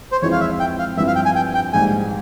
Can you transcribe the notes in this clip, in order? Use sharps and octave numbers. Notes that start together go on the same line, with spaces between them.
C5
F2 E3 G#3 C4 E4 C#5
F5
E5
G5
F5
G2 F3 C4 E4 E5
F5
G5
G#5
G5
G5
A#1 G#2 G3 G#5